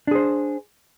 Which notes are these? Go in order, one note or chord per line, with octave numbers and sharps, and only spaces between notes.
D4 G#4 C5